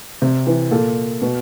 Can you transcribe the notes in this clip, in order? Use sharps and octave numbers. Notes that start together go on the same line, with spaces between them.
C3
E3
A#2 A4
B2